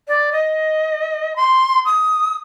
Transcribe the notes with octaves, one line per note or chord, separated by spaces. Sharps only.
D5
D#5
C6
D#6